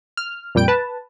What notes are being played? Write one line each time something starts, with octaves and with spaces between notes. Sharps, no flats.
F6
F2 A#2 G3 G5 D7
B4 A5